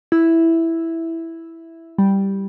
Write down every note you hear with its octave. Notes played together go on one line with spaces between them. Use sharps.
E4
G3